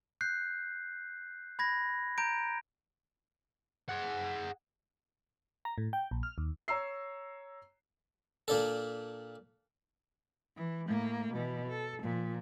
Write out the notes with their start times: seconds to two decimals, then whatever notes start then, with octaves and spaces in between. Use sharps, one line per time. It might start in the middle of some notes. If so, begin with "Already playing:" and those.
0.21 F#6 G6 C7
1.59 B5 G#6 A#6
2.18 A#5 G6 D7
3.89 G#4 F#5
5.65 A#5
5.78 A2
5.93 G5
6.11 A#1
6.23 F6
6.38 D#2
6.68 C#5 A#5 E6 C7
8.48 A#2 D4 A4
10.57 E3
10.88 A2 A#3
11.33 B2 E3
11.69 A4
12.03 A#2 F3